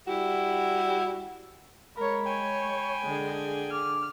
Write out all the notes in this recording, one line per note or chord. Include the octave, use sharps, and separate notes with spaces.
G3 E4 F#4 G4
G#3 A#4 C#5 B5
C#5 G5 G#5
D3 G#3 G#4
D6 F6